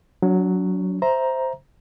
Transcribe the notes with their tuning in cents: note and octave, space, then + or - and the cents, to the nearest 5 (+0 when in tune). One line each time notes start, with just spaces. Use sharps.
F#3 +0 D4 -40
C5 +0 E5 +0 A#5 +10